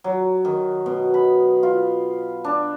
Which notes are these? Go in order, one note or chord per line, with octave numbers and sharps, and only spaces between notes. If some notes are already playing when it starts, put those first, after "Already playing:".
F#3
D#3
B2
B5
F4
D4